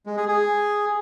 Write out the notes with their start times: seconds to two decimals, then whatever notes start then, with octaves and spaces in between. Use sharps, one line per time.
0.06 G#3
0.17 G#4
0.28 G#4